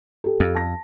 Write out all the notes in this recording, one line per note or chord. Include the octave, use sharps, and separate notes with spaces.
G4 A4
F2
A5 A#6